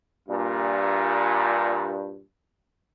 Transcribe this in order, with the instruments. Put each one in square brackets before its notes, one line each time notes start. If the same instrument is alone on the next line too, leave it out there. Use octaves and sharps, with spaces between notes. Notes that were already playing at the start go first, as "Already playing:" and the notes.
[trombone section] G2 A#2